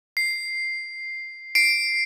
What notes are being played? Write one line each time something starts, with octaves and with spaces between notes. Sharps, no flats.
C7
C7 D7